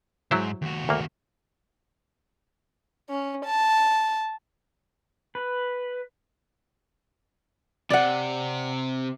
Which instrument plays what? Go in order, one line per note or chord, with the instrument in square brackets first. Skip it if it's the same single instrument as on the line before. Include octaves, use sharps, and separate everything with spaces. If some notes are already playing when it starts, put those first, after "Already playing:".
[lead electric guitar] D2 G#2 [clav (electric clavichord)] F#3 E4 C5
[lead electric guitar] D#2 F#4
[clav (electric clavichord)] D2 A#3
[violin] C#4
A5
[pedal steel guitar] B4
[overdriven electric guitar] C3 [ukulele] D5 F#5